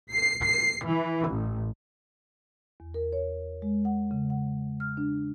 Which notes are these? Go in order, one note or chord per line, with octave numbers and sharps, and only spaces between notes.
C7
C7
E3
A1
E2
A#4
C#5
G#3
F#5
C#3
F#5
F6
D4